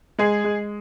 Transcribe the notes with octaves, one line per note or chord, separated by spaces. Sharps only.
G#3 G#4
G#3